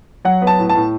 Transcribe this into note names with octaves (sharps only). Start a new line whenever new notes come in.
F#3 F#5
B3
A5
A2
A5
A2